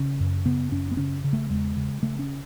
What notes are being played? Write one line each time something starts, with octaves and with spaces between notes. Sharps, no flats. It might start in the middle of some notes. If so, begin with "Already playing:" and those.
Already playing: C#3 C#4
F#2
C#3 B3
F#2 C#4
B3
C#3 C#4
C#3
A3
E2 G#3
C#3
C#3 A3
C#4